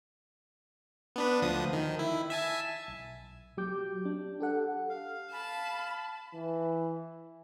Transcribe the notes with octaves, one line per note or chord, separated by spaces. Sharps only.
B3 D4 B4
D2 F3 D#6
D#3
E4
E5 G#5 A5
B1
F#3 G4 D6 G6
D4
G4 A4 F#5
F5
A5 B5
E3